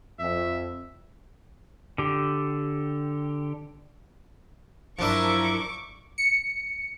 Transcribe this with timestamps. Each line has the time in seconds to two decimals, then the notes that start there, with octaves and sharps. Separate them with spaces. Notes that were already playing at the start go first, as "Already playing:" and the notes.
0.19 F2 E5
1.98 D3 G4
4.98 G2 F3 F#3 D4 E4 A#4 C#6 D6
6.18 C#7